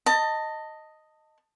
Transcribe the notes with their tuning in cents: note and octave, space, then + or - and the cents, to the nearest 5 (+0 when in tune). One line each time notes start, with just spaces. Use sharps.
D#5 +0 A5 +25